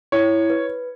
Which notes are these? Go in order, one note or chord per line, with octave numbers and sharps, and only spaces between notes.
E4 C#5
B4